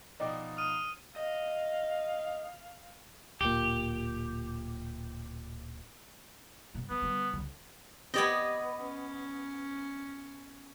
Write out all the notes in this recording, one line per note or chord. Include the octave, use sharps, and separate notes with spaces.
B2 F3 D#4 D5 D#5 G5
D#6 F6 D#7
D#5 F5
D1 A#2 G4
G2 B2
D3 B3
D3 G3
C#2 D3
B3 C4 G4 D5 D#5 G#6
C#4